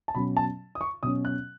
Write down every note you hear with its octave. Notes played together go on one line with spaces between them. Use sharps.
A5
B2 F#3 C#4 B5
A5
D#6
C#6
B2 F#3 C#4 D#6
F#6